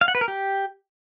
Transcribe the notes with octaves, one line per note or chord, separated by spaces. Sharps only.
F5
F#5
B4
A#4
G4